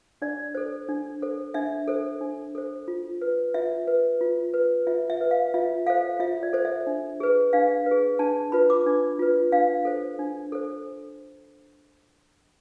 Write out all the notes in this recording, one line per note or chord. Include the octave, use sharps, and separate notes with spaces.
D4 D5
A4 C5
D4
A4 C5
D4 E5
A4 C5
D4
A4 C5
F4
B4
F4 E5
B4
F4
B4
F4 E5
E5
B4
F5
F4 E5
A4 C5 F5
F4 E5
D5
A4 C5
E5
D4
G#4 B4
D4 F5
G#4 B4
D4 A5
F4 B4 B5
D6
D4
F4 B4
D4 F5
A4 C5
D4
A4 C5